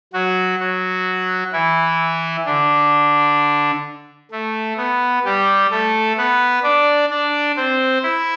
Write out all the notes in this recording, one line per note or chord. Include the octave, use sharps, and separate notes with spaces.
F#3 F#4
F#3 F#4
E3 E4
D3 D4
A3
B3
G3 G4
A3 A4
B3 B4
D4 D5
D4 D5
C4 C5
E4 E5